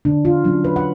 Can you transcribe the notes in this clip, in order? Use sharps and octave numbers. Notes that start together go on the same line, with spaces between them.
D3 D4
F4
F#3 C#4 D4
B4
F#5